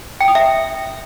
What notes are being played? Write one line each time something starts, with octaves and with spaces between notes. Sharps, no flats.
G5
D#6
E5